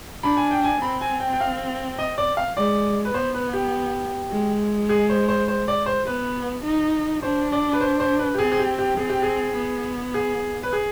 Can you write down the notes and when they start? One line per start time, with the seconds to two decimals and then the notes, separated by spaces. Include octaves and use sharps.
0.23 D4 B5
0.37 G#5
0.51 G5
0.64 G#5
0.82 C4 B5
1.01 G#5
1.20 G5
1.34 G5
1.41 F5
1.99 D#5
2.18 D5
2.37 F5
2.57 G#3 D5
3.05 B4
3.14 B3 C5
3.34 B4
3.53 G4
4.31 G#3
4.89 G#4
5.09 C5
5.28 C5
5.48 C5
5.68 D5
5.86 C5
6.06 B3 B4
6.64 D#4
7.22 D4 C5
7.52 D5
7.73 B4
7.81 C5
8.00 C5
8.19 B4
8.34 G4
8.38 C4 G#4
8.52 G#4
8.59 G4
8.78 G4
8.97 C4 G#4
9.09 G4
9.22 G#4
9.55 B3
10.14 G#4
10.63 B4
10.73 G#4